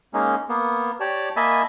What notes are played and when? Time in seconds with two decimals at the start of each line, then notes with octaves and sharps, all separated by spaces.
0.14 G#3 A#3 C#4 D#4
0.49 A#3 B3
1.00 G4 C#5 D5 A5
1.36 A#3 D#5 E5 G#5 A5 B5